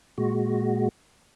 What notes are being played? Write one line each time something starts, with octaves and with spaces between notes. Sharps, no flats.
A#2 G#3 F#4